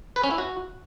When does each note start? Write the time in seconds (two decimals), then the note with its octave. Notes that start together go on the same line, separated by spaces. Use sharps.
0.16 B4
0.24 C#4
0.31 E4
0.38 F#4